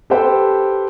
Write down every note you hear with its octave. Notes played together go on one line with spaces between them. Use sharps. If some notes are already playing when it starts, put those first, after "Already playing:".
G4 A4 B4 C5 G5